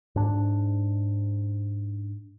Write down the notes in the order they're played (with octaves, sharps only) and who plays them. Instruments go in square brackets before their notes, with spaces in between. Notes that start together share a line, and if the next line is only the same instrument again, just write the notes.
[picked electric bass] G#2 D4